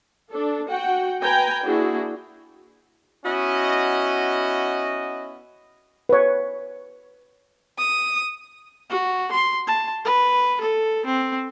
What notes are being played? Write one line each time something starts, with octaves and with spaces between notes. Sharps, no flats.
D4 A4
F#4 F#5 G5
B4 G5 G#5 A#5
A#3 D4 E4 F#4 G#4
B3 C#4 E4 F#4 D#5
B4 C#5
D#6
F#4
C6
A5
B4
A4
C4